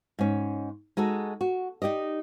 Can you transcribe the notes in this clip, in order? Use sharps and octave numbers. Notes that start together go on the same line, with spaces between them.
G#2 C#4
G#3 D#4 F#4 A4
F#4
D#4 G4 D5 D#5